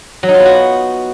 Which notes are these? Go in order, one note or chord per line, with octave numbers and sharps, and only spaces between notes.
F#3
D#4
F4
B3
F#4